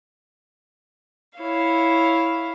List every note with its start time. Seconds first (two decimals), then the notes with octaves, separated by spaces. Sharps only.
1.38 E4 C#5 F5